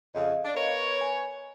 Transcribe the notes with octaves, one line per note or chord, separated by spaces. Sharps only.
F2 C#3 D#5 F5
D4
B3 A#4 C#5
G#5